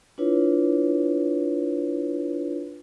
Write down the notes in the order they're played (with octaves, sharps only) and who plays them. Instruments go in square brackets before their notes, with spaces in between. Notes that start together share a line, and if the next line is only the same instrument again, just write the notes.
[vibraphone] D4 E4 F4 B4 C#5